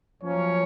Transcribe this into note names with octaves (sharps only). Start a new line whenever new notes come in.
F#2 F3 A#3 C#4 C#5